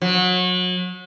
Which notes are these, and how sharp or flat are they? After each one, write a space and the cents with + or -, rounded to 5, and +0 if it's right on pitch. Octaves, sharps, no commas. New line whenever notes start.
F#3 -30